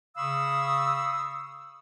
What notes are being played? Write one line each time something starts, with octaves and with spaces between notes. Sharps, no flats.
C#3 F5 B5 C#6 D#6 E6